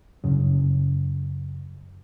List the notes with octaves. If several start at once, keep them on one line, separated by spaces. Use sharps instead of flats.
F#2 C#3